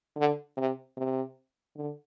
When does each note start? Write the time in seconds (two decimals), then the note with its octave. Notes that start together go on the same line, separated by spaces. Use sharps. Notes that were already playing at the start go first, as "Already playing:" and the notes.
0.17 D3
0.57 C3
0.97 C3
1.76 D3